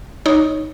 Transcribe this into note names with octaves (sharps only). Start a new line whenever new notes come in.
D#4 C#5